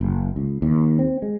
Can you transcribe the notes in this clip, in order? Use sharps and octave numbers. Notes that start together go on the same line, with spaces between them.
F#1
C#2
D#2
C4
G#3